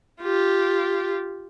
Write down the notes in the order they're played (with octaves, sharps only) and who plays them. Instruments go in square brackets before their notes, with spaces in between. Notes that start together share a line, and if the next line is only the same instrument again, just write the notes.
[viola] F4 G4